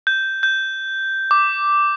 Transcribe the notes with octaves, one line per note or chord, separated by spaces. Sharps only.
G6
G6
D6